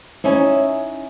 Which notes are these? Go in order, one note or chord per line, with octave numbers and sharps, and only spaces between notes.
C#4 D#4 E4